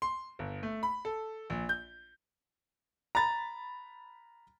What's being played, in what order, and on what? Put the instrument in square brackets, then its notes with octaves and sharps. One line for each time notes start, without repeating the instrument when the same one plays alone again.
[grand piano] C6
G1
A3
B5
A4
A#1
G6
A#5 B5 A6